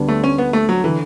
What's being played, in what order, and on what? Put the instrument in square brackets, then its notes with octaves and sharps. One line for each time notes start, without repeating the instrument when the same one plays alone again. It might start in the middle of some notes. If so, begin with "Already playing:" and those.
Already playing: [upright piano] D2 D3 G3 B3 D4
[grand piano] A3
C#4
B3
A3
F#3
[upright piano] D3 [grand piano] E3